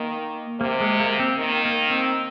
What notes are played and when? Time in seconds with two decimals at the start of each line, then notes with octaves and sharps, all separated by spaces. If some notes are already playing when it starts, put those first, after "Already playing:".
Already playing: D#3 A#3
0.60 C3 A#3
0.80 G#3
1.00 A#3
1.20 C4
1.39 D#3 A#3
1.65 A#3
1.90 C4